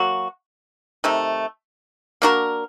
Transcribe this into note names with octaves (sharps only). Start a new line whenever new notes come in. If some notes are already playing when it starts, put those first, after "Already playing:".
Already playing: F#3 A#3 F#4
C3 D#3 A3
A#3 D4 F#4 A#4